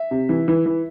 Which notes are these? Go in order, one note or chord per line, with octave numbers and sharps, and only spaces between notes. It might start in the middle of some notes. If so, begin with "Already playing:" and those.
Already playing: E5
C3
E3
E3
E3